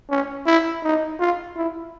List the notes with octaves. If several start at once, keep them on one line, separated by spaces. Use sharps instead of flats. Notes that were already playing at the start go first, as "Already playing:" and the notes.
C#4
E4
D#4
F4
E4